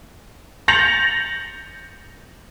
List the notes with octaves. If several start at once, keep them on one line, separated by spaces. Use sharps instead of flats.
G6 A6 A#6 C#7 F7 F#7